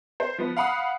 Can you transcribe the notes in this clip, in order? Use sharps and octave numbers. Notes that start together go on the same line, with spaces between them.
C5
F3 B3
F5 F#5 B5 D#6